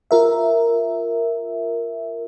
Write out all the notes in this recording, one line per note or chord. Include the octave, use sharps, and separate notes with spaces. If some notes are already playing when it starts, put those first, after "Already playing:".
F4 A#4 E5